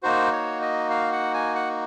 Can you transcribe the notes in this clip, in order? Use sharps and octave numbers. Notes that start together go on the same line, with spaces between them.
A#3 D#4 F#4 C5
C#5
D#5
F5
F#5
G#5
F#5